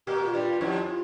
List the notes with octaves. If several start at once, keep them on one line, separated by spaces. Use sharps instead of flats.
A#2 A#3 G4
F4
G2 G3
F4
F2 F3 E4
F4